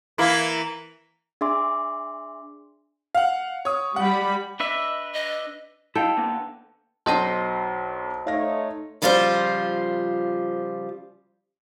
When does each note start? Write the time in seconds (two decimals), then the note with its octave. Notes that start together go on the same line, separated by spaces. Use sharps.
0.18 E3 A#3 E4
1.41 D4 G#4 E5 C6 D6
3.15 F5 F#5
3.65 C#5 D#6
3.96 G3 F#5 B5
4.60 D4 B4 D#5 E5
5.13 D#5
5.95 E4 A4 D#5 F5 G5
6.17 D3 A#3 B3
7.06 B1 D4 A4 C5 D#5 C6 D#6
8.27 A3 D#4 C#5 F5 A#6
9.02 C#3 F3 G3 F4 B4 C5